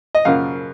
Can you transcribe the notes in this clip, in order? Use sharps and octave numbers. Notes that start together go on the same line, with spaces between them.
D#5
F#2 C#3 F3 A#3 F5